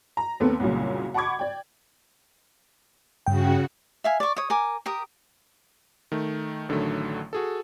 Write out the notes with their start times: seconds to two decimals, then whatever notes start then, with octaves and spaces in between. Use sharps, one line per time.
0.17 A#5
0.40 D#2 A3 B3 C4 A4
0.60 C2 F#2 A#2 C#3
1.14 F#5 A5 B5 C#6 D6 G#6
1.39 D5 G5
3.26 G2 C#3 F#4 G5
4.04 E5 F5 G#5
4.20 D5 C#6
4.36 C#5 D#6
4.50 A#4 G#5 D6
4.86 G4 A#4 D#6
6.12 D#3 A3
6.69 A1 D3 D#3 F#3 A3
7.33 F#4 G#4 A4